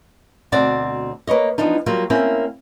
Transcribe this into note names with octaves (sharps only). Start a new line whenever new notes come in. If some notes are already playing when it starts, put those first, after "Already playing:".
D2 B2 C4 D5 F#5
A#3 B4 C#5 D#5
E3 F3 B3 D4 D#4
F#3 G3 A#3 F4
A#3 C4 C#4 E4